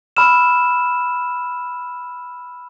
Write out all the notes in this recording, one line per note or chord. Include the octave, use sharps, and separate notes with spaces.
B5 E6 F6 E7